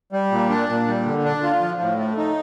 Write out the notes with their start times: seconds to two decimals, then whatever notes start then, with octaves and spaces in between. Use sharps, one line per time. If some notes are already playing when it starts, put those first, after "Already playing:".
0.12 G3
0.31 A#2
0.50 D4
0.69 A#2
0.87 G3
1.05 D3
1.24 D4
1.43 F4
1.61 F3
1.81 A2
1.99 A3
2.18 D#4